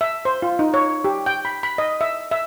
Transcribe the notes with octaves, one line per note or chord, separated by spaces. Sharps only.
E5
C5
F4
D#4
C#5
G4
G5
B5
B5
D#5
E5
E5